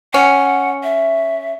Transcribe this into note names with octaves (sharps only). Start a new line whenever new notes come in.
C#4 F#5
E5